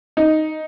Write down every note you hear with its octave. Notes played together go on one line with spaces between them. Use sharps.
D#4